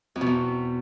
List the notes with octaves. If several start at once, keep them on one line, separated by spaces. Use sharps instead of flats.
F2
B2
E2